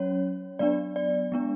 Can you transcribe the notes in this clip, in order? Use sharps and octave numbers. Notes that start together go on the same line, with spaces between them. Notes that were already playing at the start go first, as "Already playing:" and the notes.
Already playing: F#3 C#4 C#5
F#3 B3 D4 D5
D5
G#3 B3 D4